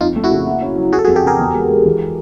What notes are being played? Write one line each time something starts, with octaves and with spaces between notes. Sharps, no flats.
F2 D#4 F4
A3
E4 F#4
C#3
A#3
C#4
F#3
F#3 F#4 G#4
A4
F#4 G#4
F2
G4 A4
C#3 G#4 A#4
E2
G#3
G#3
E3